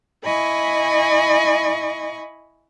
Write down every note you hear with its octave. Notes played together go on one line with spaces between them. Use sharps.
E4 D#5 G#5 B5 C#6